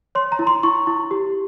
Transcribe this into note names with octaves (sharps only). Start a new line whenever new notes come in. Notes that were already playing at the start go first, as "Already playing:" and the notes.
C#5 C6
A#5
E4
C6
E4 C#6
E4
G4